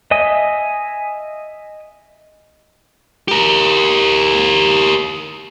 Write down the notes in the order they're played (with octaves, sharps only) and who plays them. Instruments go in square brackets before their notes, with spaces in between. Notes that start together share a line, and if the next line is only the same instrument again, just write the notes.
[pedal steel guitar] D#5 E5 G#5 D#6
[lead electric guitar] G4 A#4